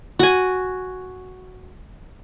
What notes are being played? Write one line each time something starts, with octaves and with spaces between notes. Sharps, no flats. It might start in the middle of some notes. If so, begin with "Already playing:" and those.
F#4 G#5